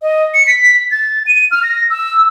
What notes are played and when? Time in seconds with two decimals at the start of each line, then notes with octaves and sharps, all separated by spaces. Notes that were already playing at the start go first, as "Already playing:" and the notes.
0.02 D#5
0.34 C#7
0.47 B6
0.91 A6
1.26 D#7
1.51 F6
1.63 A#6
1.90 E6